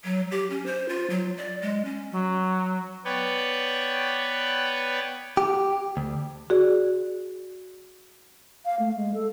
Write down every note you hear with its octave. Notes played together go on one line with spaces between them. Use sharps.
F#3
G4
C#4
C5
F4
F#3
D5
G#3
C#4
F#3
B3 B4 C#5 D5 G5
G4
D2
F#4 G#4 D5
F5
A3
G#3
A4